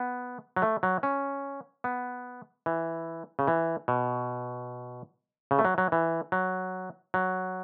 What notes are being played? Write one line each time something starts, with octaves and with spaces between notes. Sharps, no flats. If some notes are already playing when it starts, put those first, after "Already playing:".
Already playing: B3
F#3
A3
F#3
C#4
B3
E3
C#3
E3
B2
C#3
A3
F#3
F#3
E3
F#3
F#3